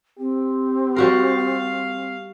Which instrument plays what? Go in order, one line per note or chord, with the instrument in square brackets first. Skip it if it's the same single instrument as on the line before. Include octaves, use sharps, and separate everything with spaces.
[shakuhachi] C4 [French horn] G4
[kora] G3 F#4 A#4 [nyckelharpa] F5